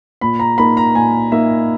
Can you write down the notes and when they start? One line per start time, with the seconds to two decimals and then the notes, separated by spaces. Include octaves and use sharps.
0.21 A#2 B5
0.39 A#5
0.58 A#3 D#4 B5
0.77 A#5
0.95 A#2 G#5
1.32 A#3 D#4 E5